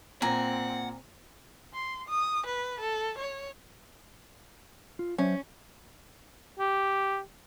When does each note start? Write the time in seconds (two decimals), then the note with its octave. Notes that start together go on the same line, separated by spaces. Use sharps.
0.22 A#2 C4 F#5 G#5 A#5
1.74 C6
2.09 D#6
2.46 B4
2.80 A4
3.18 C#5
4.99 F4
5.18 F#3 C#4 C5 E5
6.59 G4